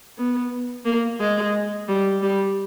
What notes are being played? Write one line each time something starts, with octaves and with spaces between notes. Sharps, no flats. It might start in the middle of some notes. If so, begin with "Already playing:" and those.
B3
A#3
G#3
G3
G3